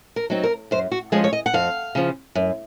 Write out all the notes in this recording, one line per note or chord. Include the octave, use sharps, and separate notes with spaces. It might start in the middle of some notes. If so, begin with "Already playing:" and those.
A#4
F#3 C4 D#4
A#4
F#2 C5
F#4
F3 G#3 C#4 G#4
C#5
D#5
F#5
F2 F5
C#3 F3
F#2